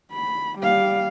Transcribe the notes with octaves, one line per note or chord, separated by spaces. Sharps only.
B5
G3 F5